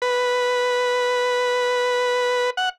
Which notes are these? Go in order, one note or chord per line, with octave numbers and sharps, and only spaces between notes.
B4
F#5